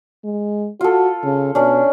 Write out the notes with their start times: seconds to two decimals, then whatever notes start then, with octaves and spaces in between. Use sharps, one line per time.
0.25 G#3
0.81 F4 F#4 A4
1.24 C#3
1.55 B2 C#4 D4